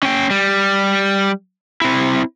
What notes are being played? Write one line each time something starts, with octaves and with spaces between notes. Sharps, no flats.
C#4 G5
G3
C4 E4